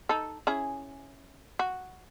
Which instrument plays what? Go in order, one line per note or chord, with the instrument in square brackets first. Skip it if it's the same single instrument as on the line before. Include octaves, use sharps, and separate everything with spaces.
[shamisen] D#4 A4
C#4 E4 G#4
F#4